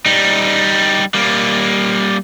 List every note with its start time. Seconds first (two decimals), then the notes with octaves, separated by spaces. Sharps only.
0.06 G3 D#4
1.14 G3 A#3